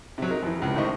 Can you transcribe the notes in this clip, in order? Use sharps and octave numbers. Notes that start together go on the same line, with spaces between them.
C3 F#3
D#4 A#4
F2 E3
C#2 C3
A2 D#3 C5 D#5 E5 C#6